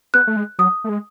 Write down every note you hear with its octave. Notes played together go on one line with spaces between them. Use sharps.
B3 F#6
A3
G#3
F#3 D#6
A3
G#3